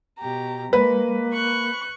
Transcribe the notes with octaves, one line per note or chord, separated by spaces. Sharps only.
B2 G4 A#5
G#3 A#3 B4
C#6 F#6